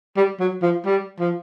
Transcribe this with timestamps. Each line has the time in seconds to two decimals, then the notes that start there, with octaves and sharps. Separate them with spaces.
0.17 G3
0.40 F#3
0.62 F3
0.86 G3
1.19 F3